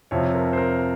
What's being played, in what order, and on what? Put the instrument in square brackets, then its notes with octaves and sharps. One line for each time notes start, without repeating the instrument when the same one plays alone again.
[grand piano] F2 C3 F3 C#5
A#4
C5
A#4